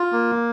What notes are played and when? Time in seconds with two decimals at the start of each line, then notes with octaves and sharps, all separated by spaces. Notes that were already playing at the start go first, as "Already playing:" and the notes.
Already playing: F4
0.12 A#3